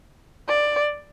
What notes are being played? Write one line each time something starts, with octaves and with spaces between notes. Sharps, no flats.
D5